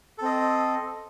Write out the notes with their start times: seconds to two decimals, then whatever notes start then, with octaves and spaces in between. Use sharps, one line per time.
0.18 A4
0.22 C4
0.25 D#5